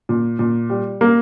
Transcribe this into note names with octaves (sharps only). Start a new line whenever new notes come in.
A#2
A#2
G3
A#3